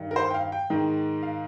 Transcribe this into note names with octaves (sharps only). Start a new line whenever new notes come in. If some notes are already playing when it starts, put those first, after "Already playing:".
Already playing: G2 D#3
A#4
C5
G5
F5
G5
G#2 D#3
F5